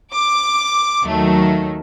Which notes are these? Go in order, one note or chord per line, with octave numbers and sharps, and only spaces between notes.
D6
D#2 D#3 F#3 A3